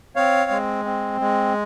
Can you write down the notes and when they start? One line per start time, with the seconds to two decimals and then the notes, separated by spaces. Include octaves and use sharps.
0.16 C4 C#5 F5
0.51 G#3
0.85 C4
1.21 G#3